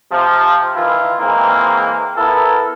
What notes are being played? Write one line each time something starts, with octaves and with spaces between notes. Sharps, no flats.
C3 F3
D#3 E3 E4 F4
E3 G#3 A#3 C4
B3 E4 A4 A#4